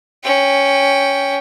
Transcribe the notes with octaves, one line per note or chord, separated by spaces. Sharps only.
C#4 G5